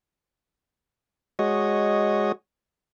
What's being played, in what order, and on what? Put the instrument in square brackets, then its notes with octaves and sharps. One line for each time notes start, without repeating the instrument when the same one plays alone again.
[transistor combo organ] G#3 F#4 C#5 D#5